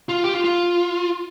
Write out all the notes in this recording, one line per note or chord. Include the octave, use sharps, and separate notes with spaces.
F4
G4
F4
F4